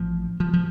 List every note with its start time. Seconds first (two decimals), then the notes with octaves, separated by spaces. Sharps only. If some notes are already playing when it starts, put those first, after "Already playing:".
Already playing: A1 F3
0.40 F3
0.53 F3